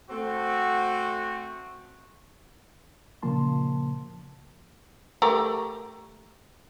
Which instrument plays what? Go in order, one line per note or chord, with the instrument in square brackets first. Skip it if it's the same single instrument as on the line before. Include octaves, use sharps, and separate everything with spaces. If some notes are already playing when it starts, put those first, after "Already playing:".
[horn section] A3 C4 F#4
[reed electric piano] A#2 C#3 F3 A#3 A5 C6
[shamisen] A3 G4 A#4